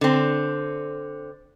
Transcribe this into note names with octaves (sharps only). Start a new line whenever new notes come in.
D3 C4